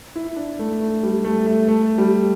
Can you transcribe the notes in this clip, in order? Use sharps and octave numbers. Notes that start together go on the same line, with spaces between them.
E4
D4
A3
A3
G3
A3
A3
A3
G3